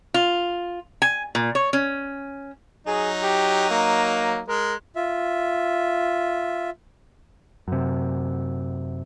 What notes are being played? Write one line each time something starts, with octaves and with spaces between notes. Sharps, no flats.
F4
G#5
A#2
C#5
C#4
F#3 D#4 G#4
G4
A#3
G#3 A#4
F4 E5
F#2 C3